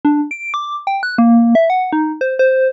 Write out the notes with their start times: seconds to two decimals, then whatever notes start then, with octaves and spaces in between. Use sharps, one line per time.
0.05 D4
0.31 D7
0.54 D6
0.87 G5
1.03 F#6
1.18 A#3
1.55 E5
1.70 F#5
1.93 D#4
2.21 C5
2.39 C5